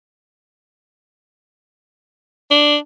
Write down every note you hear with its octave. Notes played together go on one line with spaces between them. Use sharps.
D4